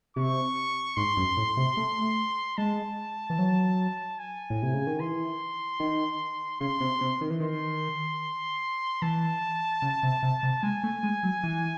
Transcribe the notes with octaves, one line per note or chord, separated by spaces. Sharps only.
C3 C#6
G#2 C6
F#2
A2
C3
A3
G#3 A5
E3
F#3
G#5
A2
C3
C#3
D#3
E3 C6
D#3
C#3 C6
C3
C3
D#3
E3
D#3 C6
E3 A5
C#3
C3
C3
C3
G#3 G#5
A3
G#3
F#3
E3